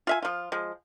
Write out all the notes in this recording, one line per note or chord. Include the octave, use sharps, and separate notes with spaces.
F4 E5 G#5
F3 F4
F3 G#3